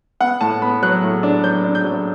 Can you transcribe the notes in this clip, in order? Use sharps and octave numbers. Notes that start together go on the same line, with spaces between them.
B3 F#5
A2 A5
B3 B5
F#3 F#6
A2
D4
F#3 G6
D4
G6
F#3